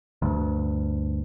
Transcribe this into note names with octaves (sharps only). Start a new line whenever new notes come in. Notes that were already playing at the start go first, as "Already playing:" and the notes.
D2 G2